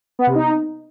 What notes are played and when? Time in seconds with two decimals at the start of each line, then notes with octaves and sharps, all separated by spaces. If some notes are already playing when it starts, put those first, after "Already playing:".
0.19 B3
0.27 C3
0.35 D#4